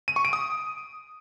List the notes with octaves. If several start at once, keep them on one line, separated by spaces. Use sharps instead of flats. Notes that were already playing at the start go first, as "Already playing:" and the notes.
D#7
C#6
D7
D#6